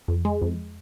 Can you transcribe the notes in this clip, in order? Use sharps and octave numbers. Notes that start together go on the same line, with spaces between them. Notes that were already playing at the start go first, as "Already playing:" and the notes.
F2
G#3
F2